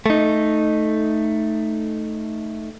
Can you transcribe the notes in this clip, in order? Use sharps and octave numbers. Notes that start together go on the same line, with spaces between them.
A3 D#4